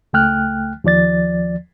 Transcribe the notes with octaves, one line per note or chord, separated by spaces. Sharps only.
C#2 A3 G5 F6 F#6
D#2 F3 D5 A6